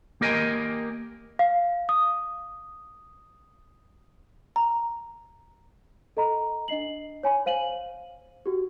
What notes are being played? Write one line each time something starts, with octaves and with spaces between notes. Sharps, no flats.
A#3 G4 A#4 D#5 G#5
F5
D#6
A#5
A4 D#5 A#5 B5
D4 D#5 C7 F#7
C#5 G#5 B5
C5 F5 D#7 F#7
F#4 G4